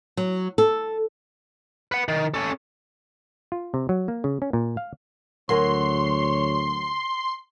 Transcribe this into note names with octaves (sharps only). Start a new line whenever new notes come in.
F#3
A4
B4 F#5
D#3
C#4 A4
F4
C3
F#3
A#3
C#3
C#4
A#2
F5
D2 F#3 A#4 C#5 G#5 C6